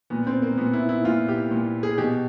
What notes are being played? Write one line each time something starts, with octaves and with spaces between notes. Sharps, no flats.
A#2 B3
C4
A#3
A#2 B3
E4
E4
A#2 F4
G4
A#2
G#4
B2 G4